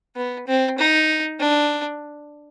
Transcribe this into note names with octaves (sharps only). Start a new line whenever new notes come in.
B3
C4
D#4
D4